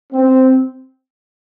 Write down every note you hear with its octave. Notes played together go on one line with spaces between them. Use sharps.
C4